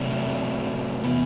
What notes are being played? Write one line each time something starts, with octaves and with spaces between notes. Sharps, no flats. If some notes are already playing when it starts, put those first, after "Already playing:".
Already playing: C3 F#3 A3 C4 D5
E3 B3